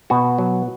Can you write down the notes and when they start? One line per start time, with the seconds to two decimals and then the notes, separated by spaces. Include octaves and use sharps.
0.10 B2 F#4
0.38 F#3